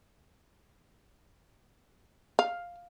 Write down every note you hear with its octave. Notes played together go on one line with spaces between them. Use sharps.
F5